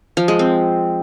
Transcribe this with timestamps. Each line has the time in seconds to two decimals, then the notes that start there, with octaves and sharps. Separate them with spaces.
0.17 F3
0.28 G#3
0.39 C4